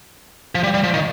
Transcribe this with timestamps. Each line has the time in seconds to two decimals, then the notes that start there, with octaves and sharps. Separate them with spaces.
0.55 F3
0.63 G3
0.74 G3
0.83 F3
0.94 D#3